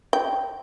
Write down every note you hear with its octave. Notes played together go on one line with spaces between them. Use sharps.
G5